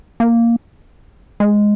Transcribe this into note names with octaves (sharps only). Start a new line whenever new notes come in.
A#3
G#3